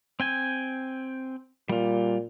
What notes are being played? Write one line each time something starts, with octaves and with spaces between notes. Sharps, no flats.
C4 G5 G#5
A#2 G3 F4